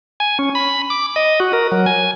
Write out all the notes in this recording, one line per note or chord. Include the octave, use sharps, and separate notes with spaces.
G#5
C#4
B5
D6
D#5
F#4
A#4
F#3
G#5